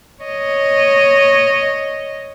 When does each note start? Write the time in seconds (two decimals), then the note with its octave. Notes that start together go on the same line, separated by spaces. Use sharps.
0.23 C#5 D#5